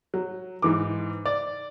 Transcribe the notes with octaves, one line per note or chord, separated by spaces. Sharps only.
F#3
G#2 E3 D6
D5